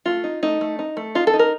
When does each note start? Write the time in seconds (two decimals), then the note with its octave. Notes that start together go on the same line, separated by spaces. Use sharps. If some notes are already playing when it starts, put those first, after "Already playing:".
0.06 A3 F4
0.24 D#4
0.43 A3 D#4
0.61 A3
0.79 D#4
0.97 A3
1.15 D#4 F4
1.27 A4
1.34 D#4
1.39 A#4